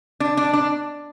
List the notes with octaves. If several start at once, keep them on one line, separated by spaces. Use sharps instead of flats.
D4
D4
D4